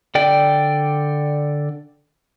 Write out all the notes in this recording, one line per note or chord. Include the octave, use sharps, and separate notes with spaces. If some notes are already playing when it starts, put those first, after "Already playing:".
D3 D5 G5